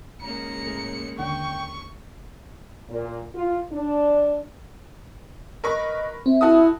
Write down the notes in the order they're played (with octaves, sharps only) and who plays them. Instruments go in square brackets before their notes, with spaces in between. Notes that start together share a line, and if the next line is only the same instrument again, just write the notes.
[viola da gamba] C#3 G#3 A#3 [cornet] A#5 [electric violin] C#7
[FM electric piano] A2 A3
[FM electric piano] D#2 D3 D4 [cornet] G5 [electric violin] C#6
[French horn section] A#2
F4
D4
[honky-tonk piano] A#4 B4 C#6 [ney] D#5
[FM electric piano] C4 [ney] E5
[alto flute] E4 [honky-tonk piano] F#4 A4 D#6